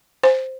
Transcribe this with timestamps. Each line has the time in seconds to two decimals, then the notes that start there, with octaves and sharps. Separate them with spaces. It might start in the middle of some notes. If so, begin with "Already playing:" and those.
0.24 C5